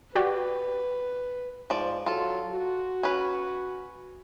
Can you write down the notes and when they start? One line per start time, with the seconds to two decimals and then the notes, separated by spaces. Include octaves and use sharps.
0.15 F#4 G4 B4 D5
1.70 G#2 F3 D5
2.06 F#3 F4 A4
2.51 F#4
3.03 C#4 B4